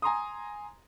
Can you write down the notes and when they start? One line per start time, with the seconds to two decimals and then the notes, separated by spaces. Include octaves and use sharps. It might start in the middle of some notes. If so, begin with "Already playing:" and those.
0.02 G#5 A#5 C6 D#6